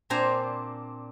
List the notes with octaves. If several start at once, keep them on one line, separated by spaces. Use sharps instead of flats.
A#2 C4 D4 C5 G#5 A#5